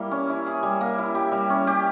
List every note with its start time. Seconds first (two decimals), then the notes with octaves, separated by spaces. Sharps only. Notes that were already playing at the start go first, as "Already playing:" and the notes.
Already playing: G3 A#3 E4
0.11 C#4
0.29 E4
0.47 G#4
0.63 G3
0.81 A#3
0.98 E4
1.15 G4
1.32 G3
1.50 C#4
1.67 G4